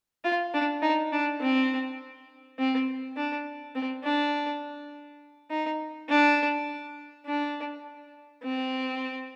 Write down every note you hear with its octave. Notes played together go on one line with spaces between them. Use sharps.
F4
D4
D#4
D4
C4
C4
D4
C4
D4
D#4
D4
D4
C4